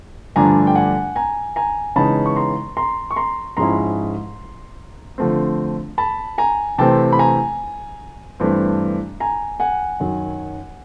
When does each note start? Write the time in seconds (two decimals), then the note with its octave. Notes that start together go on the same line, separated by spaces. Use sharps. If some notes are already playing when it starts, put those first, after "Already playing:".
0.36 G2 D3 F3 A3 D4 G#5 A#5
0.67 G5
0.75 F#5 G#5
1.16 G#5 A#5
1.56 G#5 A#5
1.96 C#3 E3 G#3 B3 D#4 A5 B5
2.26 C#6
2.36 A#5 C6
2.77 A#5 C6
3.11 C#6
3.16 A#5 C6
3.57 G#2 F3 G#3 C#4 E4 A#5 C6
5.18 D3 F3 A3 C4
5.98 A5 B5
6.38 G#5 A#5
6.78 C3 E3 A3 C4 G5 A5
7.13 B5
7.19 G#5 A#5
8.40 G2 E3 A3 C4
9.20 G#5 A#5
9.60 F#5 G#5
10.00 F#2 D#3 F#3